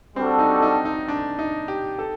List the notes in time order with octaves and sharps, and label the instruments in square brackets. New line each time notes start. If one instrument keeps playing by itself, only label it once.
[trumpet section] G3 D4 F#4 A4 [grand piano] C4
[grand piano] D#4
D#4
D#4
D4
D#4
G4
A4